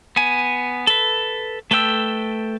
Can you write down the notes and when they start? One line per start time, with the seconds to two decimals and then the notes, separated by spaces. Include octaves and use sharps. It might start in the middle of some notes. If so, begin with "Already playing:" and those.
0.16 B3 G#5
0.87 A4 B4
1.71 A3 A4 B4 G5 E6